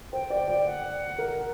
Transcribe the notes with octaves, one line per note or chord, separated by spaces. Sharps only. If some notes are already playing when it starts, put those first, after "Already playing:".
C5 G5
D5 G5
D5 G5
F#5
A#4